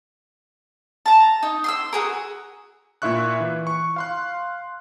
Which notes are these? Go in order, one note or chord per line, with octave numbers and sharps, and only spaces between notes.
A5 A#5
D#4
C6 D#6 E6
F#4 G#4 A#4
A#2 E4 F4 E5 C#6 F#6
E3
C#6
F5 C6 F#6